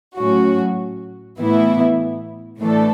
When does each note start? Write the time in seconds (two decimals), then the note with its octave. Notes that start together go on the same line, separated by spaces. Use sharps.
0.17 A2 F#3 C#4 F#4
1.39 A2 E3 B3 E4
2.60 A2 E3 A3 D4 A4